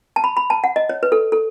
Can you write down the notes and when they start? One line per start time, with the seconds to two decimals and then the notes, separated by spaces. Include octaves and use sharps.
0.16 A5
0.24 B5
0.37 B5
0.50 A5
0.64 F#5
0.76 D#5
0.89 C#5
1.03 B4
1.12 A4
1.32 A4